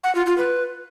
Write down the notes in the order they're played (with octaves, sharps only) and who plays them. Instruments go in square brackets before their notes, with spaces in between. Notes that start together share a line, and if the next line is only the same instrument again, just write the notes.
[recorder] F#5
F4
F4
B4